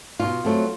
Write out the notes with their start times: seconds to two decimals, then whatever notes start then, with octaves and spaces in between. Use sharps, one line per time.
0.19 B2 F4
0.45 F#3 A3 C4